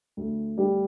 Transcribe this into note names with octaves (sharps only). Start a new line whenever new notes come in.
D2
G3